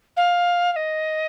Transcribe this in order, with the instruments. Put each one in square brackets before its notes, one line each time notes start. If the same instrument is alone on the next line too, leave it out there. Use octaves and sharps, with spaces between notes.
[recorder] F5
F5
D#5